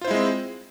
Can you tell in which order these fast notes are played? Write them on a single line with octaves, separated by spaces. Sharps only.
F4 C5 E4 G#3 C4